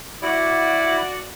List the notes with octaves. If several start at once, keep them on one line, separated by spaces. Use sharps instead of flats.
E4 F#4 D5